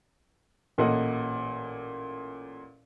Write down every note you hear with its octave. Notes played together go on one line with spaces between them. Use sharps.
A1 A#2 A#3 A4 D#5 F#5